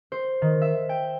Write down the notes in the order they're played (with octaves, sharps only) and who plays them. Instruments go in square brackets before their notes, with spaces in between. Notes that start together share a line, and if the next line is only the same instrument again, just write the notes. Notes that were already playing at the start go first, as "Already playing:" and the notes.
[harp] C5
D#3
E5
G5